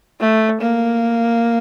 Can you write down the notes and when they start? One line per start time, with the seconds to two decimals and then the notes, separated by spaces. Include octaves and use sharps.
0.20 A3
0.61 A#3